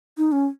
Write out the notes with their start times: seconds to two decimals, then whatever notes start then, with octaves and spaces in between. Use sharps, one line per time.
0.18 D#4
0.32 C#4